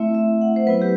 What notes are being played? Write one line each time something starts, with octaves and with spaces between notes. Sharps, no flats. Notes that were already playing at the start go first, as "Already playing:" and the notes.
Already playing: A3 C4 E4 E5
E5
F#5
C5
F#3 B3 E4 B4
G4